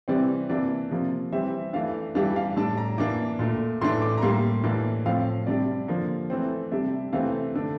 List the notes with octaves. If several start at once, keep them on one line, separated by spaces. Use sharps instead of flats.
C3 E3 G3 C4 D5
C3 E3 A#3 D4 D5
C3 F3 A#3
E3 G3 C4 E5
E3 A3 D4 F5
E3 G3 D4 F5
F5
A2 G3 D4 A5
A#5
E3 A#3 D4 D6
A#2 A3 D4
A2 E3 A3 D4 C6
D6
A#5
A2 G3 A#3 C6
A2 E3 A#3 D4
A2 F3 C4 F5
C3 G3 D4 D5
D3 F3 A#3
E3 A3 C4
C3 G3 D4 E5
C3 E3 A3 C4 F5
D3 A3 D4